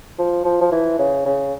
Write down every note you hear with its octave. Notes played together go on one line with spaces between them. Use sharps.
F3
F3
F3
E3
C#3
C#3